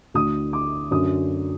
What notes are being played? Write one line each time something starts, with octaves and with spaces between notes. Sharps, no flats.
D2 D3 D#6
D6
F#2 D3 D#6